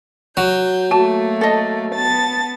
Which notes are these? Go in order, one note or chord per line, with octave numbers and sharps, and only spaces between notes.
F#3 F#4 G6
A3 A#3 F#4 A5
A4 D#5
B3 A5 A6